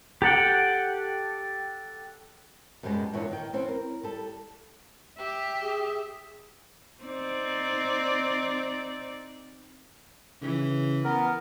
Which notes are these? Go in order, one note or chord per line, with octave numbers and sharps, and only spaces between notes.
G4 A4 F#5 G5
F#2 B2 F3 G3 G#3
E2 G2 A#2 D3 C#5
D#3 G5
E2 C4 C#4
A#4
G3 A4
G4 E5
G#4
C4 D#4 D5
C#3 E3
B3 A#4